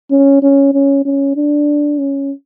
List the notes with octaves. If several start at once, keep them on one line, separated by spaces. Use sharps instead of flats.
C#4
C#4
C#4
C#4
D4
C#4